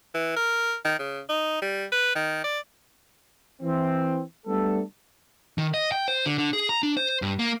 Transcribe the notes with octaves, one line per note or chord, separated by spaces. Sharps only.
E3
A#4
D#3
C#3
D#4
G3
B4
D#3
D5
E3 C4
G3 A3 B3 D4 A4
D#3
D#5
G5
C5
D3
D3
G#4
A#5
D4
C5
G2
A#3